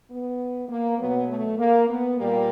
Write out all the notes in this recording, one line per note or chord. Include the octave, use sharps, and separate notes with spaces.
B3
A#3
B2 F#3 B3
A3
A#3
B3
A#2 G3 A#3